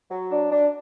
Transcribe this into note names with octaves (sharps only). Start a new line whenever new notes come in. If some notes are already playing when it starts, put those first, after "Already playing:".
F#3
D4
D4